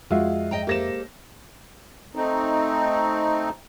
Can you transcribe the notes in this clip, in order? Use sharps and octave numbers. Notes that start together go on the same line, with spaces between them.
F2 G#3 F4 F#4 E5
D#5 G5 A#5
A#3 G4 A4 C5 A#6 E7
A3 C4 D#4